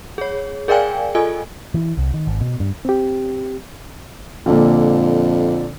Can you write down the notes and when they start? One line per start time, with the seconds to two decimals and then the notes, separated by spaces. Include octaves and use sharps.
0.18 G#4 C#5
0.68 G#4 A#4 D5 F5 G5 G#5
1.15 F4 A4 D#5 G#5
1.74 E3
1.97 C2
2.14 D#3
2.27 G#1
2.41 B2
2.60 G2
2.85 C4 G4
4.46 F2 A#2 D3